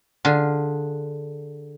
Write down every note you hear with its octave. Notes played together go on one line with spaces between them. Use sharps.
D3 F4 G#4